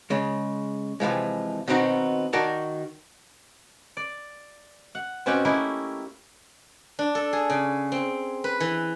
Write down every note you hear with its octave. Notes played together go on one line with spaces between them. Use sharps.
C#3 G#3
C3 E3 F3 G#3
B2 D#3 B3 C4 D#4 F#4
D#3 F#4 A#4 D5 A5
D5
F#5
B2 C4 C#4 G4 F#5
A3 A#3 C#4 D#4 E4 G4
D4
A4
G#4
C#3
C4
B4
E3